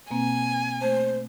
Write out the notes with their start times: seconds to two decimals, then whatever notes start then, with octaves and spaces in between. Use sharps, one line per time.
0.11 B2 A#3 C4 G#5
0.82 A3 C5 A5